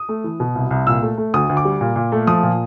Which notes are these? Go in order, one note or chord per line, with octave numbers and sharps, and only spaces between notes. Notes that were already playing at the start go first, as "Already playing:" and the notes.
Already playing: D#6
A3
E3
B2
C2
C2
A#2 E6
A3
A3
D2 D#6
D2
D6
G3
A#2
A#2
A3
F3 D#6
A#2